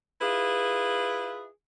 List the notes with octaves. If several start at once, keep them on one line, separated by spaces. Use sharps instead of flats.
E4 F4 G#4 B4